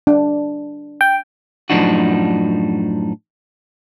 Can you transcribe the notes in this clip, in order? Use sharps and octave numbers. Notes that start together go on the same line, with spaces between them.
D4
G5
F#2 A2 F3 D4 D#4 F#4